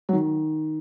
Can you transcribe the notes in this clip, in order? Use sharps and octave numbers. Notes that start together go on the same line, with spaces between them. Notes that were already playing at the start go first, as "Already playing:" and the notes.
F#3
D#3